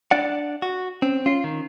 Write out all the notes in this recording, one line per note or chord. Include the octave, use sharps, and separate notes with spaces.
D4 D5 F#5
F#4
C4 C#4
C#4 F4 C7
D#3